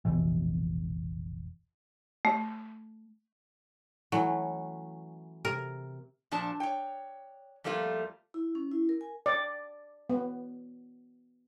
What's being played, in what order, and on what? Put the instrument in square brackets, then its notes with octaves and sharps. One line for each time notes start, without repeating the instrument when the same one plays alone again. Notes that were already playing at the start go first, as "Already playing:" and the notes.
[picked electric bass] F1 A#1 B2 E3
[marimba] A3
[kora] E3 A3 C#4 [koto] F#3
[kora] C3 [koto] A#4
[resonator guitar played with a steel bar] A#2 F3 D4 A5
C#5 G5
F2 G3 A3 A#3 F4
[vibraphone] E4
C#4
E4
A#4
G#5
[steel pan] D5
B3